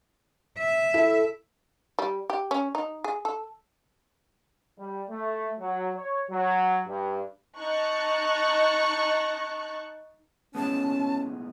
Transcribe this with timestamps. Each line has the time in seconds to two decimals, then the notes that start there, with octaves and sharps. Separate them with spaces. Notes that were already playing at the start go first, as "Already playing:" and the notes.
0.58 E5
0.94 E4 A4
1.99 G3
2.30 G4
2.51 C#4
2.75 D#4
3.04 G#4
3.25 A4
4.79 G3
5.10 A3
5.59 F#3
5.96 C#5
6.30 F#3
6.87 G2
7.58 D#4 A5 C#6 F#6
10.55 A2 G#3 B3 C#4 A5